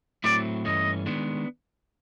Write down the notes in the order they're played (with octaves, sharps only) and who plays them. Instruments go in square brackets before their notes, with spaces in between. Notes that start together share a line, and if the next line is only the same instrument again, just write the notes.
[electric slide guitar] A2 F#3 A3 C4 E4 [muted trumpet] D5
[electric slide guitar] G2 E3 A3 C#4 [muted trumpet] D#5
[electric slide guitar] D#3 G#3 B3 D4